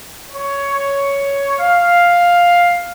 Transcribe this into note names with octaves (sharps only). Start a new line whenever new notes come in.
C#5
F5